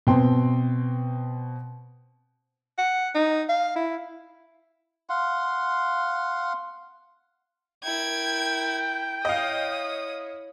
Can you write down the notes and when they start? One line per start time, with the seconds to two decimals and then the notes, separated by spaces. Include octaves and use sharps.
0.07 B2 C4 G5 C6
2.78 F#5
3.15 D#4
3.49 F5
3.76 E4
5.09 F5 F#5 C6
7.84 E4 A#4 G5 G#6
9.25 E4 C#5 D#5 F5 D#6